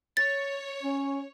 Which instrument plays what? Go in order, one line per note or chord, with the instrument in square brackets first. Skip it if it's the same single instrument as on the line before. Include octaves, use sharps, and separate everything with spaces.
[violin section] C#5 [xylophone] A6
[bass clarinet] C#4